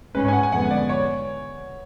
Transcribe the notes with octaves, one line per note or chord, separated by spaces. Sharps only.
G#2 G#3 C#4 B4
C#5
G#5
F#5
G#5
F2 D3 G#3 B3 F#5
D5
C#5